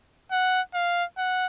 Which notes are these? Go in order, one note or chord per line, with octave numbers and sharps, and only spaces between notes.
F#5
F5
F#5